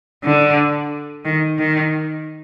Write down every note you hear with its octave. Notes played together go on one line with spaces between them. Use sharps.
D3
D#3
D#3